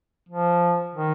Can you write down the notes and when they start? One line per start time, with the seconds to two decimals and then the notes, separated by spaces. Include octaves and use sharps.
0.29 F3
0.94 D#3